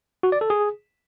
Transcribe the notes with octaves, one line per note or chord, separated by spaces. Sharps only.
F#4
D5
A4
G#4